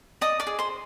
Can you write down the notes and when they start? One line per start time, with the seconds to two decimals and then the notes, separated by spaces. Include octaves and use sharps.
0.21 D5 D#5 D#6
0.40 D5 D6
0.47 G#4
0.59 C5 C6